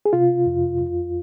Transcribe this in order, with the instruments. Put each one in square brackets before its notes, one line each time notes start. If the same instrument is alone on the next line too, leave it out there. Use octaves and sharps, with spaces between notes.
[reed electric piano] G#4
C3 F4
F2
F2